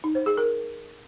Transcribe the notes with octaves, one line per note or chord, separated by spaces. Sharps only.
D#4
C5
G#4
A#4